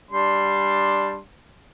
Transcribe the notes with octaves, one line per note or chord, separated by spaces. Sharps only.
G3 D4 C6